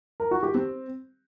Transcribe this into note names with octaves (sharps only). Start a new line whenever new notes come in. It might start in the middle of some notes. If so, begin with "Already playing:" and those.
A#4
F#4
G4
C4